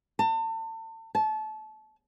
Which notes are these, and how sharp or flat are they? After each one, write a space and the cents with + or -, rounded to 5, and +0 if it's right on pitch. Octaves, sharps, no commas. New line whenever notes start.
A5 +35
A5 -25